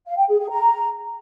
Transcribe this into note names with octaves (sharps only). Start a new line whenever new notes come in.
F5
G5
G#4
G#4
A#5